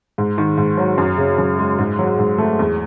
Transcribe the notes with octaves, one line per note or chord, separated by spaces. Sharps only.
G#2
D#3
G#2
F#3
F#2
C#3
F#2
G#3
G#2
F#3
G#2
A3
E2